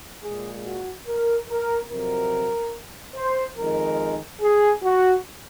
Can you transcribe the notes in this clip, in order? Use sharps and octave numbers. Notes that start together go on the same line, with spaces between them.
A#2 G#3 G#4
F#4
A#4
A#4
F2 C3 F#3 A#4
C5
F2 D#3 G#3 A#4
G#4
F#4